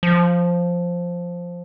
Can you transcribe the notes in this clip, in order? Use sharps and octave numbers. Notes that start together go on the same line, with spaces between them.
F3